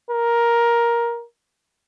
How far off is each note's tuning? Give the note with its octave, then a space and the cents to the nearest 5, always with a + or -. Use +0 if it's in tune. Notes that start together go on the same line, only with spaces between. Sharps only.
A#4 +10